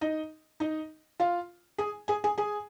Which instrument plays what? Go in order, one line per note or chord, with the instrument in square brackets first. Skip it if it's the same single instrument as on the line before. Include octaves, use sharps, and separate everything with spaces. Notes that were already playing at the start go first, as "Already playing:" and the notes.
[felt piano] D#4 D#5
D#4 D#5
F4 F5
G#4 G#5
G#4 G#5
G#4 G#5
G#4 G#5